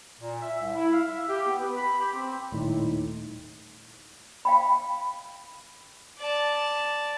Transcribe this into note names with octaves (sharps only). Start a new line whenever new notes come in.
A#2
E5
C2
E4
F5
E5
G4
B3
B4
B5
G4
C4
D#1 A2 D#4
F5 G5 B5
D5 A5